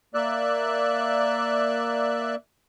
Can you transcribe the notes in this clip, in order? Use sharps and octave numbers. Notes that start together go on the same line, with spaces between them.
A#3 D5 E5 F#6